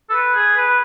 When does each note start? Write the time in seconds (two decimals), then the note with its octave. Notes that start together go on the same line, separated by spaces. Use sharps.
0.09 A4
0.13 B4
0.35 G#4
0.56 B4